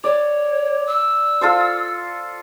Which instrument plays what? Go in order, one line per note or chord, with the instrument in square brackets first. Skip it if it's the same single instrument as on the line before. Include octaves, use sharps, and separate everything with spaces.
[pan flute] C#5 [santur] D5
[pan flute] E6
[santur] F4 A4 C5